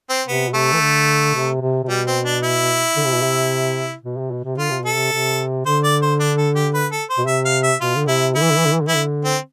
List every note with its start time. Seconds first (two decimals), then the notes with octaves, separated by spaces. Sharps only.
0.10 C4
0.28 C3 B3
0.49 B2
0.54 C3 A3
0.73 E3
0.82 D3
1.35 C3
1.61 C3
1.84 C3
1.89 B2 G3
2.07 C4
2.25 D4
2.43 E4
2.96 D3
3.06 C3
3.15 B2
3.22 C3
4.04 B2
4.17 C3
4.31 B2
4.44 C3
4.58 D3 F4
4.70 C3
4.82 B2 A4
4.95 C3
5.12 C3
5.66 D3 C5
5.84 D5
6.02 C5
6.20 D4
6.38 A4
6.55 G4
6.74 B4
6.92 A4
7.10 C5
7.18 B2
7.27 C3 E5
7.45 F5
7.63 E5
7.81 B2 F4
7.96 D3
8.08 C3 E4
8.35 D3 E4
8.42 E3
8.51 D3
8.58 E3
8.66 D3
8.74 E3
8.81 D3
8.88 E3 E4
8.96 D3
9.25 C4